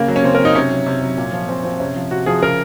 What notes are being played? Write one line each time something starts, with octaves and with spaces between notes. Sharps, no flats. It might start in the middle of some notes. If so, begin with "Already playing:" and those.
Already playing: C#3 A#3
F#3
C#4
C#3 C4
F#3 A#4
D#4
C3 C#4
F#3
C3
F#3
A#2
F3
A#2 C4
F3 C4
C3 C#4
F3
C3 F#4
F3 G#4
C#3 A#4